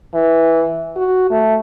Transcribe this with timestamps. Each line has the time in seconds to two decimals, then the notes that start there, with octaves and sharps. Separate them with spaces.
0.15 E3
0.96 F#4
1.31 A3